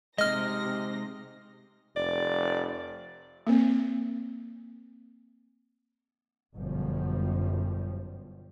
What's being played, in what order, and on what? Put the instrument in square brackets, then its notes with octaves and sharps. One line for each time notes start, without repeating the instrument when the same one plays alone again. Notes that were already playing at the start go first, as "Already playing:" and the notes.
[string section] C3 A#6 [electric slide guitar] G#3 D#4 [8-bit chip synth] D#5 F6
[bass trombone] F1 [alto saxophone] D5
[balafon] A#3 C4
[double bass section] G1 F#2 B2 F3 G3